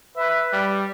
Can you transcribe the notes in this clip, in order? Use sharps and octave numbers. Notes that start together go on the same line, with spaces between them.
B4 E5
G3